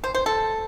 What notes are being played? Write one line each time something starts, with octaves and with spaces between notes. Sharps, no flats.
C5
C5
A4